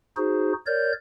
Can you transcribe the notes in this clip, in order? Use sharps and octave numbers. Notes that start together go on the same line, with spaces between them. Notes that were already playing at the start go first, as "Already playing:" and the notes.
D#4 F#4 G#4 C5
A#4 C#5 D5 G6